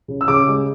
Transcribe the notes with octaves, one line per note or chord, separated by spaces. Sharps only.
C#3
E6
C#3 D6
G#3